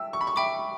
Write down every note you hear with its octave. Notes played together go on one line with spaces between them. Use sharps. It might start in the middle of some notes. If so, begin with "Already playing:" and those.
Already playing: E5 G5 E6
C#6
B5
C#6
E5 G5 B5 D6